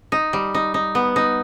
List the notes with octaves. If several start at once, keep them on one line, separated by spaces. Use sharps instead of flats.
D#4
G3
D#4
D#4
B3
D#4